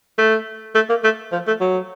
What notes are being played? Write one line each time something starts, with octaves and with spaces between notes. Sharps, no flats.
A3
A3
A#3
A3
F3
A3
F#3